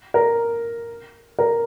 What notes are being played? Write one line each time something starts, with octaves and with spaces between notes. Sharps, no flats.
A#4
A#4